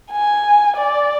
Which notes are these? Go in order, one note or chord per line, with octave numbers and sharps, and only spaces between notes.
G#5
D5